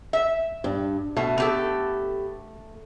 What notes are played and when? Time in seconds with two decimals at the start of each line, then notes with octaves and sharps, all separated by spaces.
0.13 E5
0.64 G2
1.17 B2 A3
1.38 B3 G4 A4